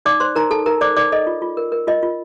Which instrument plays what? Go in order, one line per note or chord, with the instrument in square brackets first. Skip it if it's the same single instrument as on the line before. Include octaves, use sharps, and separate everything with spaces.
[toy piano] D#4 D5 D6
C5 C6
D#4 A#4 A#5
A4 A5
D#4 A#4 A#5
C5 D5 D6
D#4 D5 D6
A4 D#5
F4
F4
A#4
A#4
F4 D#5
F4